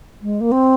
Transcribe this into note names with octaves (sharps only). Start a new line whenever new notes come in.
G#3
A#3
C4